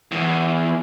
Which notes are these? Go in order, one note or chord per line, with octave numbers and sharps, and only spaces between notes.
E2 E3